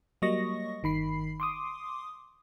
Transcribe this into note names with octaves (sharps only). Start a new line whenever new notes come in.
F#3 G3 A#3 D#5 C#6 A#6
G1 D#3 B5 C7
C6 D6 D#6